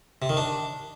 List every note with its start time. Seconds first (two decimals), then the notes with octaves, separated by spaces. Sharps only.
0.22 C3
0.29 D#3
0.37 D4